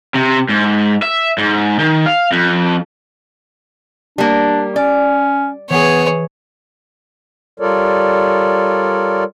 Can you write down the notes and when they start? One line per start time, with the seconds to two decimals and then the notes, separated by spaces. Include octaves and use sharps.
0.15 C3
0.50 G#2
1.03 E5
1.38 G#2
1.79 D#3
2.06 F5
2.32 F2
4.18 G3 A#3 D4
4.76 C#4 D5
5.70 E3 B3 G#4 C#5
7.60 G3 F4 A4 A#4 C#5 D5